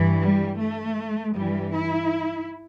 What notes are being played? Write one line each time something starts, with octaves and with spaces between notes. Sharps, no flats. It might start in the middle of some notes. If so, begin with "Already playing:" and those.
Already playing: G2 E3
G3
A3
G2 E3 G3
E4